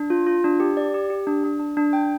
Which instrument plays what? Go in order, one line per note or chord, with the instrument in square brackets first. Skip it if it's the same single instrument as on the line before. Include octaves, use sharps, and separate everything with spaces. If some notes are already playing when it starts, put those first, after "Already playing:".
Already playing: [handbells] D4
F4
F4
D4
G4
D5
G4
G4
D4
D4
D4
D4
G5